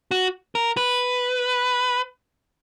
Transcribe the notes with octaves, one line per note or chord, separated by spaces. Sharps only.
F#4
A#4
B4